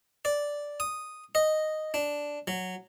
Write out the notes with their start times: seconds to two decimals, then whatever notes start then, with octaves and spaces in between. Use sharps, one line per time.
0.25 D5
0.80 D#6
1.35 D#5
1.94 D4
2.47 F#3